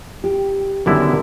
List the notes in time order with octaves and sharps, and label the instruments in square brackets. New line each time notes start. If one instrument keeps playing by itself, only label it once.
[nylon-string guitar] G4
[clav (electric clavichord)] F#2 D3 E4 [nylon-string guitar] D#3 G3 B3